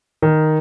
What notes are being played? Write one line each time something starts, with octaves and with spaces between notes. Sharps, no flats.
D#3